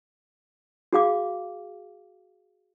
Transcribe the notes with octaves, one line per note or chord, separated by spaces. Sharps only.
F#4 G#4 F5 D6